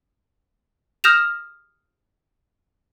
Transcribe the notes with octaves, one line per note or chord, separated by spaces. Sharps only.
D#6 F6 G6 A#6 E7 F7